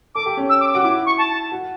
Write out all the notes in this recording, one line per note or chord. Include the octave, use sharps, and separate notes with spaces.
A4 D6
G4
C#4
E6
D6
D6
F#4
E4 D6
C#6
A5
F#4